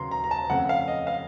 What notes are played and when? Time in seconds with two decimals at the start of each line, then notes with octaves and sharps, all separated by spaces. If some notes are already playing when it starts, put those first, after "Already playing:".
Already playing: D#2 C#3 F#3 A#5 C6
0.11 A#5
0.24 A#5
0.31 A5
0.49 F2 C#3 A3 F#5
0.69 F5
0.88 D#5
1.07 F5